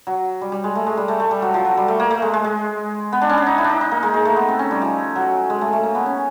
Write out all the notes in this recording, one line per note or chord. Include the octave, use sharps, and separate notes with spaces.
F#3
G3
G3
G#3
A3
G#3
G3
A3
A3
G3
F#3
F3
F#3
G3
A3
A#3
A3
G#3
G#3
G#3
B3
D4
C#4
D4
D#4
E4
D4 D#4
D#4
A#3
G#3
G#3
A3
B3
C4
C#4
G3
F3
F#3
G#3
A3
A3
A#3
B3
C#4